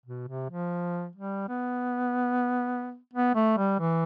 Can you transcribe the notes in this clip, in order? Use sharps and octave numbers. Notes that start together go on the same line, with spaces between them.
B2
C3
F3
G3
B3
B3
A3
G3
E3